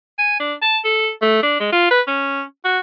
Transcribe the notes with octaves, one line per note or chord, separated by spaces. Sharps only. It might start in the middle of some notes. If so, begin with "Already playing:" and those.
G#5
D4
A5
A4
A3
D4
G#3
F4
B4
C#4
F#4